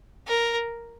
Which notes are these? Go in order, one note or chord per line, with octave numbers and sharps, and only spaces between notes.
A#4